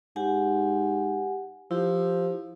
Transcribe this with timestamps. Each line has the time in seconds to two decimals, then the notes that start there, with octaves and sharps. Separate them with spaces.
0.16 G#2 G4 F#5 G#5
1.71 F3 E4 G4